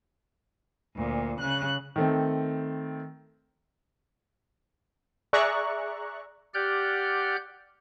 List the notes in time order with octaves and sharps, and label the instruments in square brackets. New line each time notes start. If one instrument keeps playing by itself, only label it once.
[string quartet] D2 A#2
C#3 F#6
[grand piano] D#3 A3 C4
[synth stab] G#4 D5 E5 A#5 C#6 F#6
[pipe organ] G4 D5 F#5 F6 G6